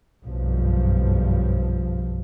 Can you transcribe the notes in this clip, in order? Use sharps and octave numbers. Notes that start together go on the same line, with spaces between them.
F#1 B1 G2 F3